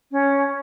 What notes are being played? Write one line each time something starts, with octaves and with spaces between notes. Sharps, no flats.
C#4